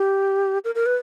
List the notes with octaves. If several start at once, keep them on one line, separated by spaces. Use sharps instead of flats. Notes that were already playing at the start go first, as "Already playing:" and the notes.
Already playing: G4
A#4
A#4
B4